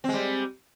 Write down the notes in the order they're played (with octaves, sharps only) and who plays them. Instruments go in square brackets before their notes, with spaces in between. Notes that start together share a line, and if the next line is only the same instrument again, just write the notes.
[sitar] C4
G#3
G3